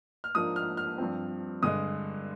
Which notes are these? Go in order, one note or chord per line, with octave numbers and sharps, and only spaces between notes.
F6
G#2 F3 A#3 D4 F4 D#6
F6
F6
G2 F3 C4
G2 D3 G#3 D#6